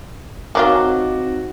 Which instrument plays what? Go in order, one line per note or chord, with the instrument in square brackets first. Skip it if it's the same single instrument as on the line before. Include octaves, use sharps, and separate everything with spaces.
[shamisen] D#3 F#3 F4 [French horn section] C4 D#4 [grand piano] F#4 D6